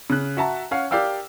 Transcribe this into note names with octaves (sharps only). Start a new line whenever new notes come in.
C#3 F#6
F#4 E5 A5 A#5
C#4 C#5 F5 F#5
G4 A#4 D5 F5 G5 E6